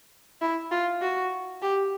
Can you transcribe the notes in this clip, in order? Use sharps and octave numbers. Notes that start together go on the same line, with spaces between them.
E4
F4
F#4
G4